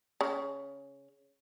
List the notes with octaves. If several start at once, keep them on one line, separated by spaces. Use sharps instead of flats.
C#3